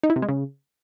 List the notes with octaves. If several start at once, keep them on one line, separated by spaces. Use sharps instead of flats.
D#4
E4
C3
G#3
C#3